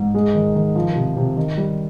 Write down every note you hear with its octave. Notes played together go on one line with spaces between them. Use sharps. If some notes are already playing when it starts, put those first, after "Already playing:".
Already playing: G#2
G#3
D#3
D#3
F3
C3
C3
D#3
G3